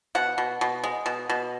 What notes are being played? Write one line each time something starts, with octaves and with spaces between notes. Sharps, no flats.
B2 F#5
B2
B2
G#3
B2
B2